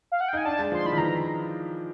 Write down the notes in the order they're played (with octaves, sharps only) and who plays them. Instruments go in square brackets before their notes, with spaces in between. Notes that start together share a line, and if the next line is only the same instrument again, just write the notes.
[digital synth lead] F5
F#5
G5
[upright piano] D#4 [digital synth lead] G#5
[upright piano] D4 [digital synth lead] A5
[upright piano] G#3
[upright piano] F3 [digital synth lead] C6
[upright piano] E3 [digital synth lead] B5
[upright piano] D#3
[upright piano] E3 [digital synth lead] A#5